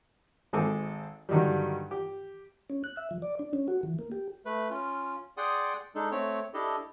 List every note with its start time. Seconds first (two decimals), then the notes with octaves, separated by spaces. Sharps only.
0.53 G#1 G#3 C4 A4 G#5 D6
1.29 G2 D3 D#3 F#3 G3
1.91 G4
2.70 C#4
2.84 F#6
2.97 E5
3.11 F3
3.22 D5
3.39 D4
3.53 C#4
3.68 F#4
3.83 E3
3.99 A#3
4.12 G4
4.45 A3 B4
4.70 C#4 F4
5.37 G#4 D5 F#5 G5 C6 D#6
5.95 G#3 D4 D#4 A4
6.11 A3 C4 C#5
6.54 D4 E4 G4 A4 D#5